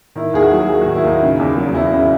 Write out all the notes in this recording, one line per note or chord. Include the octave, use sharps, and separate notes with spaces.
D#3 E4
D#2 G#4
F#4
F#3
D#2 G#4
D#3 F#4
E4
D#2 D#4
C#3
E2
F#3
E2 E4
C#3